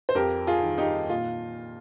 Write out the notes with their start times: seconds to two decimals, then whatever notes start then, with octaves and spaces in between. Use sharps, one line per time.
0.09 C5
0.15 F2 G4 A#4
0.47 F4 G#4
0.62 D#3
0.78 D#4 G4
1.09 A#2 F4